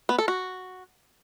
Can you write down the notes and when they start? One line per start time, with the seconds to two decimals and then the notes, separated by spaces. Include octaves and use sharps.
0.09 B3
0.19 A4
0.28 F#4